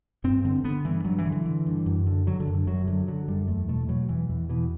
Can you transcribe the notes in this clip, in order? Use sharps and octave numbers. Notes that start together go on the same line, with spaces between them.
G2 C4
D3 C4
D3 B3
G2 E3
G2 F#3
E3
D3
E3
D3
G2
F#2
D3
D3 F#3
D3
F#2
D3
F#2 F#3
D3 F#3
D3 F#3
F#2 G3
E2 A3
B2 A3
B2 F#3
E2 E3
E2 E3
B2 E3